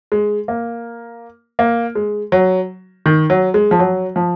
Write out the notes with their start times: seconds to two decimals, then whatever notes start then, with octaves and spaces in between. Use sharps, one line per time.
0.12 G#3
0.48 A#3
1.59 A#3
1.95 G#3
2.32 F#3
3.06 D#3
3.30 F#3
3.54 G#3
3.71 F3
3.79 F#3
4.16 F3